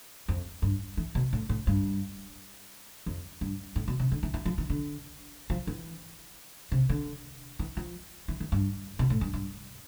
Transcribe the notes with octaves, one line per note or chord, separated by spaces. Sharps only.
F2
G2
E3
B2
A2
A2
G2
F2
G2
A2
B2
C3
D3
E3
E3
F3
E3
D3
F3
E3
C3
D3
E3
F3
E3
E3
G2
B2
A2
G2
G2